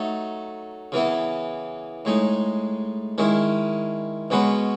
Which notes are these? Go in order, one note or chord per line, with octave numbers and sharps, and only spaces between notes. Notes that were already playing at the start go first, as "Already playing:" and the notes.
Already playing: F#3 A3 D#4
C#3 E3 B3 E4
A2 G#3 D#4
D#3 G#3 C#4 E4
B2 G#3 C#4 F#4 B4